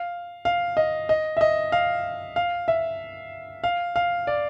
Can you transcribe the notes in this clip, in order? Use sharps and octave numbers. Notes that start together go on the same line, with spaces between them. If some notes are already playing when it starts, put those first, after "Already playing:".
Already playing: F5
F5
D#5
D#5
E5
D#5
F5
F5
E5
F5
F5
D5